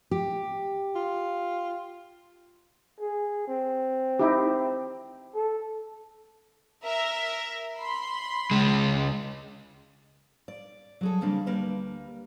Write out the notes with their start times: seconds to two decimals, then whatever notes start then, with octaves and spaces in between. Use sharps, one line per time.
0.11 G4
0.95 F4
3.01 G#4
3.48 C4
4.19 D#4 E4 G4
5.35 A4
6.83 A#4 E5
7.77 B5 C6
8.51 C#2 G#3
10.48 D5
11.01 F#3 G#4 A4
11.21 C#3 E3 G3 A#3 C4 D4
11.46 D2 G3 A#3 B4